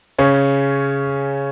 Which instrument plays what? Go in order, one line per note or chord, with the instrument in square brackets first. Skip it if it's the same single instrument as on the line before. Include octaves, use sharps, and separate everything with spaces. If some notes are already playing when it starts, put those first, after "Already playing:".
[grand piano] C#3 C#4